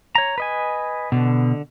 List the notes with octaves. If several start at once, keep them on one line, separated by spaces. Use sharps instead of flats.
C#5 A#5
B4 D#5 G#5
B2 D3